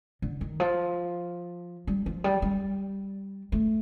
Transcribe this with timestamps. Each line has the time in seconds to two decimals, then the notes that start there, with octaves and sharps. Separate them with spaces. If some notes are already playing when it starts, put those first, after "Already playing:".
0.22 D3
0.41 D#3
0.60 F3
1.87 G3
2.06 F3
2.24 G3
2.42 G3
3.52 A3